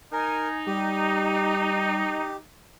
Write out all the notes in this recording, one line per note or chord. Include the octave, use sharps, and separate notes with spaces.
D#4 A#4 G#5
G3 G4